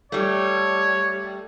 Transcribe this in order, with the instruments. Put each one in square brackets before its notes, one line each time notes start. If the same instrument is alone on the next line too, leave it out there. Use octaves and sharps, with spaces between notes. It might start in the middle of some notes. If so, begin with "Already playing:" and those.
[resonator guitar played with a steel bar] G3 A3 [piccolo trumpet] C#5